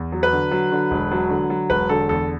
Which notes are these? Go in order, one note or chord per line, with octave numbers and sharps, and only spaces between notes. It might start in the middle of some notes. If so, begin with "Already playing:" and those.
Already playing: E2
F#3
B4
D3
F#3
D3
E1
F#3
D3
F#3
E1 B4
D3 A4
E2 A4